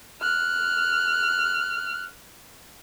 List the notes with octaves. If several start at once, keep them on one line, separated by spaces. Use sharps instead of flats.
F6 F#6